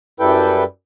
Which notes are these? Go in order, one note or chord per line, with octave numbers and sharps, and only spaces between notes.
F#2 G3 E4 A4 B4 G5